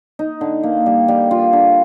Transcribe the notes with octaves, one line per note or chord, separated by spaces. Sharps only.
D#4
D3
A#3
G3
G3
F4
D3